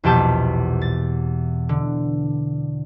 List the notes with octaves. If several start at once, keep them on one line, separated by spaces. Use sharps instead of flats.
A#1 E2 B2 G4 A5 G6
A6
D3